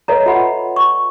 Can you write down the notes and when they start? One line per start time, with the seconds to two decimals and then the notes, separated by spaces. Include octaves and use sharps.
0.08 A4 B4 C#5 D#5 E5 A#5
0.26 F4 E5 F#5 B5 C6
0.76 C#6